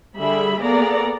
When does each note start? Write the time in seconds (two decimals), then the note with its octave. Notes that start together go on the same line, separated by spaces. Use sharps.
0.15 D3 G3 G#4 E5 B5
0.60 A#3 B3 G#4 A4 D5 A#5